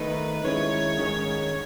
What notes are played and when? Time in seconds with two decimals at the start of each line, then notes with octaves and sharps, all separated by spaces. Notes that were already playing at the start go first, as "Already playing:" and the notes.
Already playing: D#3 A3 D#4 B4
0.44 D#3 G#3 C#4 E4 C#5
0.97 G#2 D#3 G#3 C#4